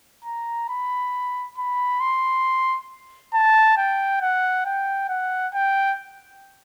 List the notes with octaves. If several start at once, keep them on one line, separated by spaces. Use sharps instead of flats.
A#5
B5
B5
C6
A5
G5
F#5
G5
F#5
G5